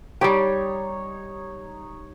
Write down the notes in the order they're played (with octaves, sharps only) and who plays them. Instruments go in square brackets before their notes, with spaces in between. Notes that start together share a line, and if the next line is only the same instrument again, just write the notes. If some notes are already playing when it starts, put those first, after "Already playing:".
[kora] G3 G4 [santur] D#4 C#5